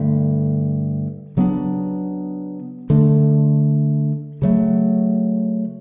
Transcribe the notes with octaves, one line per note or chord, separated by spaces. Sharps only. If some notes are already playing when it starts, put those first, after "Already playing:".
Already playing: G2 D3 A3
C#3 F#3 B3 D4
D3 A3 D4
C#3 F#3 A3